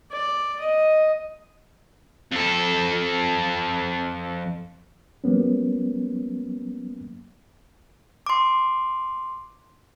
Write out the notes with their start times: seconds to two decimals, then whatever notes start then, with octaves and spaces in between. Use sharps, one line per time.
0.12 D5
0.61 D#5
2.32 F2 A4
5.24 F#3 G3 A#3 B3 C#4
8.26 C6 D6